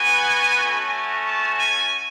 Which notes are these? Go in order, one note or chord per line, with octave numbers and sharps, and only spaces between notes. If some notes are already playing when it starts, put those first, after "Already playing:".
Already playing: B3 F#4 G#5
A3 C#4 F#4
A5
G#5